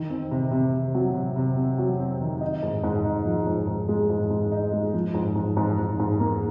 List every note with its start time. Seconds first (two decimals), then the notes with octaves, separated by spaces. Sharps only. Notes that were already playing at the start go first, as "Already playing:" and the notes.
Already playing: D#3
0.10 C4
0.31 C3
0.51 C3
0.74 C3
0.94 F#3
1.14 C3
1.36 C3
1.57 C4
1.78 F#3
1.99 C4
2.21 D#3
2.41 D#4
2.63 G#2
2.83 G#2
3.04 D#4
3.25 F3
3.47 G#2
3.67 G#2
3.89 G#3
4.10 G#2
4.30 G#2
4.52 D#4
4.73 G#3
4.94 F3
5.14 G#2
5.35 G#2
5.57 G#2
5.78 G#2
6.00 G#2
6.20 A#3